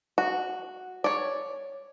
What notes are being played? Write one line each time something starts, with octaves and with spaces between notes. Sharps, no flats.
F#4
C#5 D5